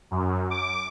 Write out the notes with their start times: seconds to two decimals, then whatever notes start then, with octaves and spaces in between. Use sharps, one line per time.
0.11 F#2
0.50 D6